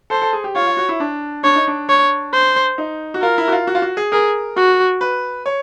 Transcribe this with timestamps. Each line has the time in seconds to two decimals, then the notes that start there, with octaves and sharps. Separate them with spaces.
0.10 A4 C5
0.22 A4
0.33 G#4
0.44 G4
0.56 F4 C#5
0.67 F4
0.77 F#4
0.89 E4
1.00 D4
1.44 D4 C#5
1.56 D#4
1.67 D4
1.89 C#5
2.33 C5
2.78 D#4
3.14 F#4
3.22 F4 A#4
3.38 E4
3.48 F#4
3.52 F4
3.67 F#4
3.75 F4
3.82 F#4
3.97 G#4
4.12 G#4 A#4
4.57 F#4
5.01 B4
5.46 C#5